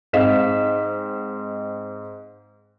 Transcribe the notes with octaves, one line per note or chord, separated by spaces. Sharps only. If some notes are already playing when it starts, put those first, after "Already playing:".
G#2 C4 D#5 F5 B6 E7